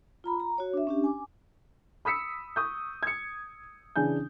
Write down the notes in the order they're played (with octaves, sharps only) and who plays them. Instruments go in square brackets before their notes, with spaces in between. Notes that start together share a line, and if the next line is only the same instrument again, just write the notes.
[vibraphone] F4 A#5 B5
A#5
F#4 C#5
D4 E5
C#4 D4 G4
G#5 D6
[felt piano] B5 D#6 E6 B6 C#7
C#6 D#6 G6
G#6 C#7
C#3 E3 D4 G#5 G6